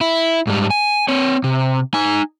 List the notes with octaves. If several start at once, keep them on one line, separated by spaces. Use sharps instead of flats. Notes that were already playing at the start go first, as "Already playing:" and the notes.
E4
G#2 G3
G#5
C4 C#5
C3
D#4 G#5